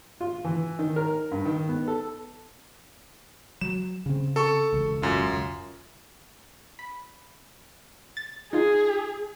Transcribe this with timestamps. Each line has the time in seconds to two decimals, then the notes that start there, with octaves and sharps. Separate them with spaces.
0.20 F4
0.45 E3
0.79 D#3
0.96 A#4
1.31 G2
1.45 D#3
1.69 B3
1.88 A4
3.61 F#3 E7
4.06 C#3 C4
4.36 A4 A5 C#6
4.73 E1 C#2
5.02 F#2 F4
6.79 B5
8.17 A6
8.53 D#4 F4 G#4